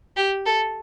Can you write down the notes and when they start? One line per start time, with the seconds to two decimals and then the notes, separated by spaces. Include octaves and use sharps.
0.16 G4
0.46 A4